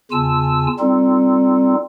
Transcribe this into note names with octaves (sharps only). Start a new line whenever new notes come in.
E2 C#3 F4 G#5 A5 E6
G3 C4 D#4 F4 A4